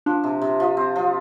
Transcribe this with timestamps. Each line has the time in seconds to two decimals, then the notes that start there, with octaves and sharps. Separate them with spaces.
0.06 F3 D4
0.24 C3
0.42 C3
0.60 F3
0.77 C4
0.96 F3